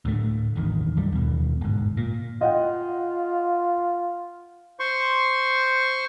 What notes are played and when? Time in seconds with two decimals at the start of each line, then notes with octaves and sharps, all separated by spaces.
0.05 D2 A2 A3
0.55 E1 A1 D#3
0.97 B1 F#2 G3
1.12 D#2 B2
1.61 G1 G#2
1.97 A#2
2.41 F4 D#5 F#5 G5
4.80 C5 C6 C#6